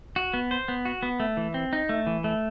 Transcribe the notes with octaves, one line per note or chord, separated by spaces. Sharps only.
F#4
B3
C5
B3
F#4
B3
A3
E3
C4
D#4
A3
E3
A3